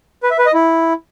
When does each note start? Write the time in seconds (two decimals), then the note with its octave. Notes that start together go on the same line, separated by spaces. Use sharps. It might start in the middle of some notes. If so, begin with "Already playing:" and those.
0.23 B4
0.31 E5
0.38 B4
0.46 D#5
0.54 E4